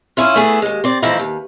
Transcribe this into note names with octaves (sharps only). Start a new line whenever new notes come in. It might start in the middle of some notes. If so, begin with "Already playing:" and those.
C#4 E4 F4
A3 B3 E4 G#4
D#2 G#3
C4 D5
E3 F3 A3 D#4 E4
D#2